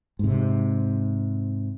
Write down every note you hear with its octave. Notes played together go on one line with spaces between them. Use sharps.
G#2 C3